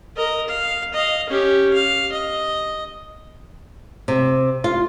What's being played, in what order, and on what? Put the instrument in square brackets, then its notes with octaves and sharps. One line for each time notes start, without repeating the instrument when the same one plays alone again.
[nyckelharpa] A#4 D#5
F5
D#5 F5
C#4 G4
F5
D#5
[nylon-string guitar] C3
F4